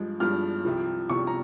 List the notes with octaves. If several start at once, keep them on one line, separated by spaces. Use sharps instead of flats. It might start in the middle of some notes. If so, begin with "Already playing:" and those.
Already playing: G2 F3 G#3
G2 F3 G#3 F6
C2 C3 F3
C2 C3 F3 C#6
A#5